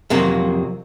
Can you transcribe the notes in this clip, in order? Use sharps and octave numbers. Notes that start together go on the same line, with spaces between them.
F2 C3 F#3 A#3